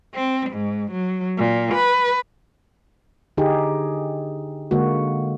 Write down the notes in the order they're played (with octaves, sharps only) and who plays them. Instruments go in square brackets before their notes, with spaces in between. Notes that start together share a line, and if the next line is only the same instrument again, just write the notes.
[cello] C4
G#2
F#3
A#2
B4
[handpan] D3 D#4 G4 G#4
D3 G#3 A#3 F#4